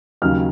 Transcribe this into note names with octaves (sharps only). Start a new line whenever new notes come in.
D#2 C#3 F#3 F6